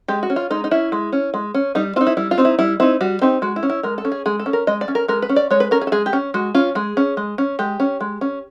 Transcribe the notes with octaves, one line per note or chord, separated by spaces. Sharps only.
G#3 G4
F#4
C#4
F4
G#3 D#4
D#4
C#4 E4
G#3
C#4
G#3
C#4
G3 D#4
C4 D#4 F4
E4
G3 E4
F4
C4 D#4
E4
G3 E4
C4 D#4 E4
G3 F#4
C4 D#4 G4
G#3 F#4
E4
C#4
E4
G#3 A#4
A4
C#4
G#4
G#3 G#4
A4
C#4
A#4
G#3 D#5
D5
C#4
A#4
G#3 A#4
B4
C#4
D5
G#3 C#5
B4
C#4 A#4
G#4
A4
G#3 G#4
G4
C#4
G#3 F#4
C#4 F4
G#3 G#4
C#4
G#3
C#4
G#3 G4
C#4
G#3
C#4